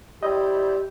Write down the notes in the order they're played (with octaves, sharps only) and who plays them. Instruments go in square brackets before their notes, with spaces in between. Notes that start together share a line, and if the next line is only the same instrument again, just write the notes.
[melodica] G3 E4 C5 [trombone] G4 [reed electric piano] D#5